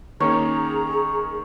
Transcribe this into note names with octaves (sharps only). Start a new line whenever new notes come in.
D#3 A#3 C#4 G#4 C#5 A#5